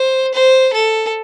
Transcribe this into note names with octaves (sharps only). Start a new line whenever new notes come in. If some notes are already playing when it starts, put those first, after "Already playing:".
Already playing: C5
C5
A4